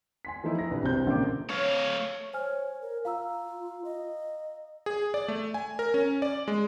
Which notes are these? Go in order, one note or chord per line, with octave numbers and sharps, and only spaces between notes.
G#5 C6 B6
E3 F3 A3 D#4 E4
A#5 A#6
C2 D4 B4
C2 C3 C4 F#4 C5 G6
A#1 C#3 A#3 C4 D5 D6
A3 C#5 F5
C5 C#5 G#5 F6
A#4
F4 F5 A#5 E6
D#5
G#4
D5
A3
G#5
A#4
C#4
D5
G#3